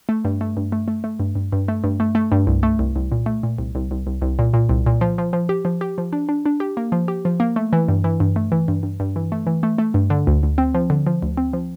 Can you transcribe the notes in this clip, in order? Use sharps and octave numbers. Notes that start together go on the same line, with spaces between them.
A3
G2
A3
G2
A3
A3
A3
G2
G2
G2
A3
G2
A3
A3
G2
C2
A3
C2
C2
A#2
A3
A#2
C2
C2
C2
C2
C2
A#2
A#2
C2
A#2
F3
F3
F3
G4
F3
G4
F3
D4
D4
D4
G4
A#3
F3
G4
F3
A#3
A3
E3
G2
E3
G2
A3
E3
G2
G2
G2
E3
A3
E3
A3
A3
G2
D3
D2
D2
C4
F3
D3
F3
D2
C4
F3